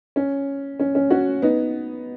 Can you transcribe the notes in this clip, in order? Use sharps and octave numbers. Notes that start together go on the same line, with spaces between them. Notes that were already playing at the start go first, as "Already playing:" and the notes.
C#4
C#4
C#4
C#4 F#4
B3 D#4